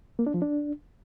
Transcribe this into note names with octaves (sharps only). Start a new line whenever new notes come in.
A#3
D4
F3
D4